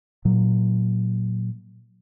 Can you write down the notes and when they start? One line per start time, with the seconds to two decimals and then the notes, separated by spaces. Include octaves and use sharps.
0.25 A#2 F#3